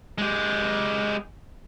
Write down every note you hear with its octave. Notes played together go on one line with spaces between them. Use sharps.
G#3 G4